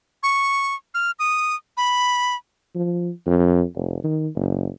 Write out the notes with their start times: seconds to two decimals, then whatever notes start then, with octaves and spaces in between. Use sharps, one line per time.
0.23 C#6
0.94 F6
1.19 D#6
1.77 B5
2.75 F3
3.26 F2
3.75 F1
4.04 D#3
4.35 F#1